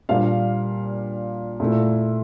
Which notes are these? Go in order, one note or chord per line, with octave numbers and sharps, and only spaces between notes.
A#2 G3 D4 F5
A#2 A3 E4